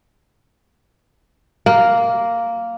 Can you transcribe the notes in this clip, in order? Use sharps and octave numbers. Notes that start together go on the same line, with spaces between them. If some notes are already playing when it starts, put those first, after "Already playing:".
A#3